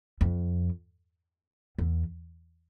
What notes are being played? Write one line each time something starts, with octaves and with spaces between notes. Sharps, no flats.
F2
E2